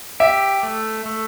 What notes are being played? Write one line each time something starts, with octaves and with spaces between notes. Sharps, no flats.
G4 E5
A3
A3